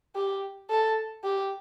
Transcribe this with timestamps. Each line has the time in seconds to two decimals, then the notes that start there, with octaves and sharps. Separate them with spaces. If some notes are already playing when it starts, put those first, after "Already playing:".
0.15 G4
0.70 A4
1.24 G4